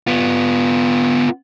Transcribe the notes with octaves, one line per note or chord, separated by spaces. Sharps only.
B3 F4